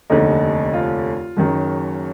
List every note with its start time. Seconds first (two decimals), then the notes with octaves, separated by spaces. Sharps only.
0.10 F1 D#2 D3 D#4
0.74 F4
1.37 F#1 F#2 D#3 F#3